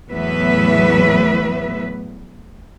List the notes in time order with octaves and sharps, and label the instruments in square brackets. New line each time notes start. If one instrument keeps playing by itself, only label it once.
[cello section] E2 A2 F#3 B3 B4 E5